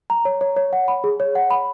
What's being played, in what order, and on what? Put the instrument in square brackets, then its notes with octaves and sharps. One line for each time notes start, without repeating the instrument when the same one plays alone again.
[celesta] A#5
C#5
C#5
C#5
F#5
B5
G#4
C#5
F#5
B5